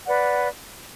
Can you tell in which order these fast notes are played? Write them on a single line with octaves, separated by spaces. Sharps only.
F#5 D5 B4